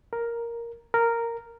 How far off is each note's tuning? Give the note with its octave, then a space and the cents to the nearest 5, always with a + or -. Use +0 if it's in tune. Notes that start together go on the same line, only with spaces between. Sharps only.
A#4 +5
A#4 -5